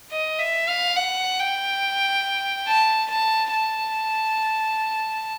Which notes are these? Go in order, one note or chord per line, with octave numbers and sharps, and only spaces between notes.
D#5
E5
F5
F#5
G5
A5
A5
A5